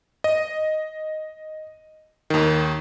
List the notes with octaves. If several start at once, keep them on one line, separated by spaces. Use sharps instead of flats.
D#5
D#2 D#3